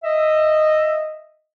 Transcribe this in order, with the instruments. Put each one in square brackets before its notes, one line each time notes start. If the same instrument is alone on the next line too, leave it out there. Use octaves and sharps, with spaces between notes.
[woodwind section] D#5 E5